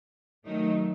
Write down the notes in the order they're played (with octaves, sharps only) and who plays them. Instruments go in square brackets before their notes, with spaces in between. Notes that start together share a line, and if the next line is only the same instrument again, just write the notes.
[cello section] D#3 F#3 A3 D#4